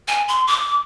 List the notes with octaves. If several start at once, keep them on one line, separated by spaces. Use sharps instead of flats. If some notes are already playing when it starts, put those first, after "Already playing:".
G#5
C6
D6